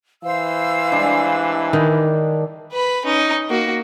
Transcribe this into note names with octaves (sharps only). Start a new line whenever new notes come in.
E3 C5 F5 E6
G3 G#3 D4
D#3
B4 B5
C#4 D#4
A#3 F#4